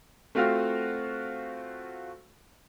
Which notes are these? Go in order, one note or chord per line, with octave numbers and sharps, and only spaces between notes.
A3 C4 F4 F#4 F5 F6